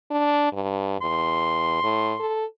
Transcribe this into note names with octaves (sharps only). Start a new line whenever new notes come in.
D4
G2
E2 C6
A2
A4